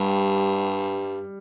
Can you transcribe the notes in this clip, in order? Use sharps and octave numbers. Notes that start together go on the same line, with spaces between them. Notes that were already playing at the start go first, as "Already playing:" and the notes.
Already playing: G2 G3